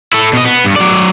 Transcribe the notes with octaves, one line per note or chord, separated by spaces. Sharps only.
E4 A4
B2 D#5
B3
G2
F#3 D5